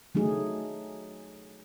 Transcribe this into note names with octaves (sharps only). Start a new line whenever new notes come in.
F#3 A3 D#4 G#4